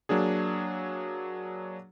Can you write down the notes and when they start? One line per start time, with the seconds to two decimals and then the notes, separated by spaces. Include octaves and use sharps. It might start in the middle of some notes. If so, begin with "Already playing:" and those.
0.09 F#3 A#3 D4 G#4